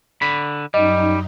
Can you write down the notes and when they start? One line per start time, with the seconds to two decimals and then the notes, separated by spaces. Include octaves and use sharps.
0.22 D3 B5
0.74 F#2 G3 D#4 D#5